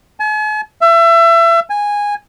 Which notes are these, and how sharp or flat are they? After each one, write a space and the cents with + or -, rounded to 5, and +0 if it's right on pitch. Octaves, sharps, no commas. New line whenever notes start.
G#5 +45
E5 +30
G#5 -10